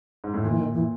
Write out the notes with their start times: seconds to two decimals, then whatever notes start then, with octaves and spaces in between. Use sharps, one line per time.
0.24 G#2
0.34 A2
0.43 A#2 D#3
0.51 E3
0.59 D#3
0.74 A#2 E3